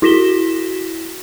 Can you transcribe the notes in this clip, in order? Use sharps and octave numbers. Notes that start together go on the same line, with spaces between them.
E4 F#4 A#6 B6 E7 G7